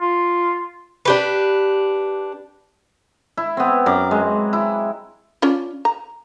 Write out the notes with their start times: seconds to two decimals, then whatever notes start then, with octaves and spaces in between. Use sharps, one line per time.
0.01 F4
1.05 D4 G4 B4
3.37 E4
3.57 B3 C4
3.86 F#2 A#5 D6
4.11 G#3
4.53 E4
5.42 C#4 D4 F4
5.85 A#5